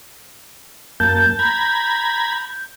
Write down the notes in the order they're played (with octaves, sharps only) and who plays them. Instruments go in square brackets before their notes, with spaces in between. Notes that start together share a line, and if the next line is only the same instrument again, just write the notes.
[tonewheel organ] F#2 A#3 A5 [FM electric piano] G6
[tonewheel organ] A#5 B5 G#6